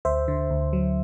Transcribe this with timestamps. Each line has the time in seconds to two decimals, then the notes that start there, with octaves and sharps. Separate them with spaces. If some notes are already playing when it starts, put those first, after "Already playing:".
0.05 D2 C5 E5
0.28 D3
0.50 D2
0.73 F#3